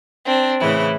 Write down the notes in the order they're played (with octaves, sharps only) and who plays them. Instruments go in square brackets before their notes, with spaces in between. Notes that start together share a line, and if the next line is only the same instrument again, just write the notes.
[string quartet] C4 D4
A2 C#3 E3 E4